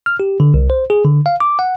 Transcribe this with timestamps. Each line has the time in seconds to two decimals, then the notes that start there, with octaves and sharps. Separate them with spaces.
0.06 F6
0.20 G4
0.40 D3
0.54 C2
0.70 C5
0.90 G#4
1.05 D3
1.26 F5
1.40 D6
1.59 F#5